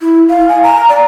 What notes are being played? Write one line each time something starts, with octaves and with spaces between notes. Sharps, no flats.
E4
F5
G#5
A#5
D5